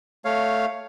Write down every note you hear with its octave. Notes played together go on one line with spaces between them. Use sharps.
A3 C#5 F5